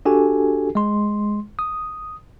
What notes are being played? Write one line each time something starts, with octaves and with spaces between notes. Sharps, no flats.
D4 F#4 G4 A4 G#5
G#3 C6
D#6